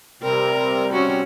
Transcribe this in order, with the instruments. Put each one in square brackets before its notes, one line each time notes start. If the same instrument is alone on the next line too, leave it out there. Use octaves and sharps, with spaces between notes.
[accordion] C3 G3 C4 [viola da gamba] A#4
[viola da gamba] C#4 F#4